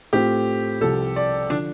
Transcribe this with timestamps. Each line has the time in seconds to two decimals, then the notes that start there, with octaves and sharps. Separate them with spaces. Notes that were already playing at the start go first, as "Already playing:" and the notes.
0.13 A2 A3 C4 F4 G4
0.81 C2 C3 F3 C4 F4 A4
1.16 D5
1.50 D3 F3 D4